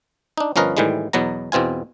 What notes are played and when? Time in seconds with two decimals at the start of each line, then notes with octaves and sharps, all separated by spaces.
0.38 D4 D#4
0.56 G1 F3 C#4 A#4 B4 D#5
0.77 A2 D#3 E3 G3 G#3
1.13 E2 B2 F#3 B3 A#5
1.52 E2 B2 C4 F4 G#5